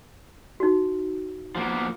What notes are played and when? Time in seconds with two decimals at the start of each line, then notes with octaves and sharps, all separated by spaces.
0.60 D#4 F#4
1.55 F3 A#3 B3